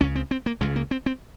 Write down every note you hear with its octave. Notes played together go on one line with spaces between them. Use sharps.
C#2 C#3 C#4
C4
C4
A#3
C#2 C#3 G#3
A#3
C4
C4